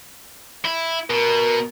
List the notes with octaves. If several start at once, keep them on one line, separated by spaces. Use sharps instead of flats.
E4
B2 A#4